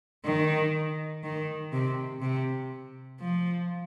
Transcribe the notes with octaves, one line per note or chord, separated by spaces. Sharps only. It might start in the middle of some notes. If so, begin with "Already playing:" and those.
D#3
D#3
C3
C3
F3